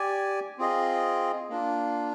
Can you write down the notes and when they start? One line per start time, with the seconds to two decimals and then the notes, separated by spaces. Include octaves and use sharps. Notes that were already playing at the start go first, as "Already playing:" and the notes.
Already playing: G4 D5 G#5
0.58 C4 F4 G#4 D#5
1.49 A#3 D4 F4